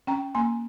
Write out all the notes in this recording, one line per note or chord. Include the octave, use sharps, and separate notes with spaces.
C#4 G5 A#5
A#3 G#5 C6